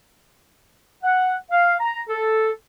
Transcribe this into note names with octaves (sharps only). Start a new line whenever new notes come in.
F#5
F5
A#5
A4